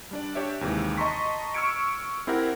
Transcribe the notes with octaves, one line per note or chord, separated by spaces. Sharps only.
G3 D4 D5
D4 G4 C#5 E5
D#2 C3 E3 G#3
D#5 A5 A#5 C6 C#6 B6
C#6 E6 F6 G#6 C#7 D7
C4 E4 G4 A#4 F#5